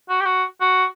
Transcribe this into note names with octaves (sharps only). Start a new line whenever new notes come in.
F#4
G4
F#4
F#4